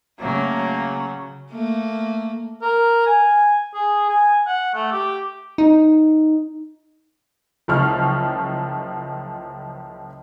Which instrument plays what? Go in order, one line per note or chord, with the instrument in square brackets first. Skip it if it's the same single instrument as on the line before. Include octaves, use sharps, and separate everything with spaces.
[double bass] C#3 [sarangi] F#3 [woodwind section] A3 A#3
[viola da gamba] A3 A#3
[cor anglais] A#4
G#5
G#4
G#5
F#5
A3
G4
[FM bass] D#4
[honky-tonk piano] F#1 C#2 F3 C#6 F6